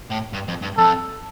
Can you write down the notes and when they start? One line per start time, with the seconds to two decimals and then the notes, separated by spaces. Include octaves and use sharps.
0.10 A2
0.33 G2
0.48 F2
0.62 G2
0.77 F2 A4